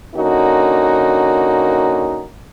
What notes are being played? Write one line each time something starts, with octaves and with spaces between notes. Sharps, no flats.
D3 A#3 C#4 D#4 F#4